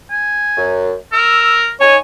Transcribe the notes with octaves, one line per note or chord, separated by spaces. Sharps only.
G#5
F#2
A#4 E6
D#4 C#5 G#5